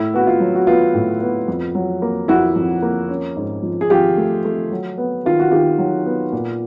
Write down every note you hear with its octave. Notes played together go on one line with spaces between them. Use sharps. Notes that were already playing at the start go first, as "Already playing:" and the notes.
Already playing: A2 E4
B3 F#4
F4
F#3
F#4
B3 F4
A2
B3
F2
F#3
A#3
F2 E4 F#4
F2
A#3
C#4
G#2
F3
G#4
F3 F4 G4
A3
A3
F#3
B3
D#3 F4
F#4
D#3 F4 G4
F#3
B3
A#2